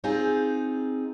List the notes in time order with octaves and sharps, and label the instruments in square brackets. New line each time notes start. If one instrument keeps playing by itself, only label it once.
[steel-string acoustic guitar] C4 D#4 F4 G#4